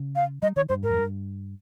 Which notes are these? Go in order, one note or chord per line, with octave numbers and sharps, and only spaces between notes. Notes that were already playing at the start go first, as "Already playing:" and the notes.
Already playing: C#3
F5
G3 D#5
D#3 C#5
G2 C5
G#2 A#4
F2
G2